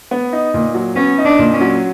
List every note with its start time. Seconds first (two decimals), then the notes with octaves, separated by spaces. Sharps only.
0.11 B3
0.33 D#4
0.54 A#2
0.75 F#3
0.96 B3 C#4
1.18 D#4
1.25 D4
1.39 A#2
1.53 C#4
1.61 F#3